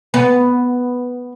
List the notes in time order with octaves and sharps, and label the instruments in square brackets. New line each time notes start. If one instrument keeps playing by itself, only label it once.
[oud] B3